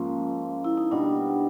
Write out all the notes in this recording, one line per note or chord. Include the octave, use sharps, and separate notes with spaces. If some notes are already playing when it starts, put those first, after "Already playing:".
Already playing: G#2 F3 A#3 C#4
E4
D#4
B2 G3 B3 D4